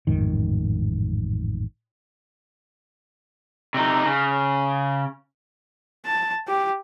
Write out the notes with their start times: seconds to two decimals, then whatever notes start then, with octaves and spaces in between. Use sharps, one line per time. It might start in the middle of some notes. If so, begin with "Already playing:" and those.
0.07 A1 F2 G#2 D#3
3.74 C3 D#4
4.06 C#3
6.05 A5
6.48 G4